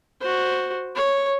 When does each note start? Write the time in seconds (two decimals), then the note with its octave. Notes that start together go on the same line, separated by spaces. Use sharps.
0.21 F#4 C5
0.96 C#5